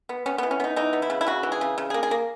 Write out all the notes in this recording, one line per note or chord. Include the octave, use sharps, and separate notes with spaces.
B3
B3 C#4
E3 B3
C#4
B3 D#4
E3 D#4
B3
E4
C#3
E4
C#3 F#4
E3
G#4
C#3
C#3
G#4
A#3
G#4
A#3